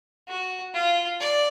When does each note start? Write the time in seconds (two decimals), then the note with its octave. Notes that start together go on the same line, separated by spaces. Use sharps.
0.28 F#4
0.74 F4
1.20 D5